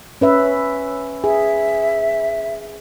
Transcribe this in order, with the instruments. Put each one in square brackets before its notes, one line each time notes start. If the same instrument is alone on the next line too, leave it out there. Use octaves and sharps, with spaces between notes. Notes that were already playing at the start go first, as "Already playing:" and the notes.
[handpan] C#4 B4 E5
[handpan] G#4 [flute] E5